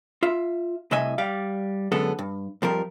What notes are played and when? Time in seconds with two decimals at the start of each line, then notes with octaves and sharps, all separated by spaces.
0.23 F4 E5
0.91 C2 A2 C3 D#5 E5 G#5
1.18 G3 D5 F5
1.92 F#2 D3 G#3 B3 A4
2.19 G2
2.62 F2 F3 G3 A#4